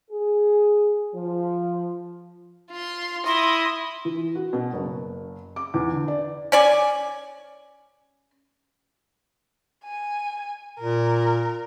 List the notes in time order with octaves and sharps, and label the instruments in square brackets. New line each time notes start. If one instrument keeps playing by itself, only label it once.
[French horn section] G#4
F3
[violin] F4 C6
[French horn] E4 [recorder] C6 [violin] D#6 A#6
[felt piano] E3
F#4
B2
F#1
D6
E2
D3
D5
[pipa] C#4 D5 G#5
[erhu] G#5
[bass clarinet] A#2 [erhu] A#4